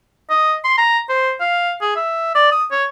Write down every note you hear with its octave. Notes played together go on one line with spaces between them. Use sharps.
D#5
C6
A#5
C5
F5
G#4
E5
D5
D#6
C#5